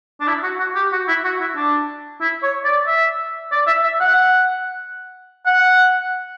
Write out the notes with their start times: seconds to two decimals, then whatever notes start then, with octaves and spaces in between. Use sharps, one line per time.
0.21 D4
0.28 E4
0.43 F#4
0.59 F#4
0.75 G4
0.92 F#4
1.08 E4
1.25 F#4
1.41 E4
1.56 D4
2.21 E4
2.43 C#5
2.65 D5
2.87 E5
3.52 D5
3.67 E5
3.84 E5
4.01 F#5
5.46 F#5